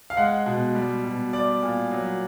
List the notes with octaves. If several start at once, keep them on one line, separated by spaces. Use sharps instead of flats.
F5
G#3 F#5
B2
G3
B2
G3 D5
A#2
F#3